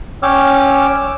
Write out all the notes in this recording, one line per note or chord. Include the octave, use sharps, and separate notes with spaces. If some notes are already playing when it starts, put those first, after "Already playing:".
C#4 C#5 G5 D6 E6 F6